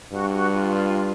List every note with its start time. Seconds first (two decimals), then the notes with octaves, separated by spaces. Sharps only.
0.12 G2 F#4
0.32 F#4
0.53 F4